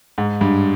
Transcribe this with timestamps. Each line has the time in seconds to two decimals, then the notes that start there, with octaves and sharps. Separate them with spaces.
0.18 G#2
0.41 G2